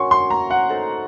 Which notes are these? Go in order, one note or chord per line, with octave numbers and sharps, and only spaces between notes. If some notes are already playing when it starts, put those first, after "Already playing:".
Already playing: C#4 F#4 A#4 C#5 C6 C#6
C6
A#5
F#5
D#4 A4 C5